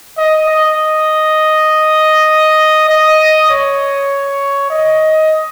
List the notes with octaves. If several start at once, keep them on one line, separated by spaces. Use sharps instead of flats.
D#5
D#5
D#5
C#5
D#5